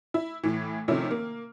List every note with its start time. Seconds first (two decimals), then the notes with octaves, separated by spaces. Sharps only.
0.14 E4
0.44 A2 E3
0.88 C3 D#3 F3 A3 C#4 E4
1.11 A#3